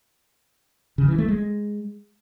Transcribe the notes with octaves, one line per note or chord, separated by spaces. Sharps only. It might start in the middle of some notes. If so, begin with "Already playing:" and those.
C#3
E3
A3
G#3